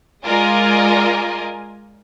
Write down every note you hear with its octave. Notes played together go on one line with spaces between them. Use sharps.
G#3 F4 A#4 D5 D#5 G#5